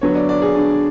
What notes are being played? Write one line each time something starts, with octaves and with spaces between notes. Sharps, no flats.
D3 F#3 B3 C#5
D5
D5
G#4
D4